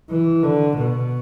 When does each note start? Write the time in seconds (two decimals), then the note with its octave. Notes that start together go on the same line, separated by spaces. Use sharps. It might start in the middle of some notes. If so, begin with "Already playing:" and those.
0.10 E3
0.43 D3
0.77 B2